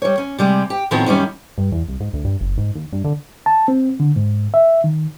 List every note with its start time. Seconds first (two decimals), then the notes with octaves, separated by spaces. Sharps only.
0.02 G3 C#5
0.18 C#4
0.38 C3 G3 G#3
0.70 G4
0.91 A2 D#3 F3 B3 C4 F#4
1.06 F#2 D#3 G3 C#4
1.58 G2
1.72 E2
1.88 C2
2.00 G#2
2.13 D2
2.25 G2
2.41 F#1
2.58 G#2
2.75 D#2
2.92 G2
3.04 D3
3.46 A5
3.68 C4
4.00 D3
4.16 G#2
4.54 E5
4.84 D#3